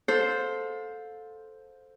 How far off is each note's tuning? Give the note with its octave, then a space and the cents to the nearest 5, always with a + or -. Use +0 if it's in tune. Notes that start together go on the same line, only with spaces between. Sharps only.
A4 +0 C5 +0 F5 +35